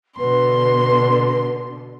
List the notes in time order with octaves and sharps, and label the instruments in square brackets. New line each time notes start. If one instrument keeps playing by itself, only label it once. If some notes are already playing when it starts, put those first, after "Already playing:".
[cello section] B2 D3 [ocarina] B4 [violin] C6